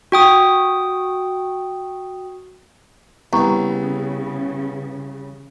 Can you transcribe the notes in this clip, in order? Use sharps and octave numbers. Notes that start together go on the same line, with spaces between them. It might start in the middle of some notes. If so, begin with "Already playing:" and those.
F#4 G5 D#6
C2 C#3 B3 A#5 C#6